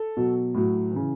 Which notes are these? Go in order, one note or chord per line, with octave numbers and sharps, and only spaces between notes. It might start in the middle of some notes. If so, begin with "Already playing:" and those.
Already playing: A4
B2 F#3
A2 F#3
C#3 E3